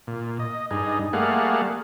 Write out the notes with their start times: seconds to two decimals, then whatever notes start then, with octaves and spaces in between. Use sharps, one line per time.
0.07 A#2
0.40 D#5
0.71 G2 D#4 G#4
1.13 G3 A3 A#3 G#4 F5 F#5